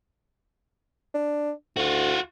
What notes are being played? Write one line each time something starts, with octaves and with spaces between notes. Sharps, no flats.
D4
D2 F4 F#4